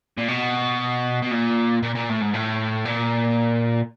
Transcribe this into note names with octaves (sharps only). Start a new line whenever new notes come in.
A#2
B2
B2
A#2
A#2
A#2
A2
G#2
A2
A#2